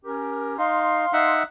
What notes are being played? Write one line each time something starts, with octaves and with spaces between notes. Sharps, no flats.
C#4 G4 A#4
D#4 F5 C6
D#4 E5 F#5